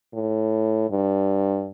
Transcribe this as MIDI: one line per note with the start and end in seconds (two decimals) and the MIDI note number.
0.13 0.86 45
0.90 1.69 43